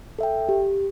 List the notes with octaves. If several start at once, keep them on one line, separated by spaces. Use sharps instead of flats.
A4 E5 G5
G4